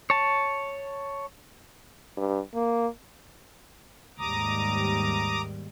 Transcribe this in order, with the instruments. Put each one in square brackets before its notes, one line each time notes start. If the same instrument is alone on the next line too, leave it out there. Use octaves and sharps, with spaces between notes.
[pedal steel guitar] C#5 A5
[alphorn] G2
A#3
[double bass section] D#2 G#2 G3 [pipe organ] A#5 D6 D#6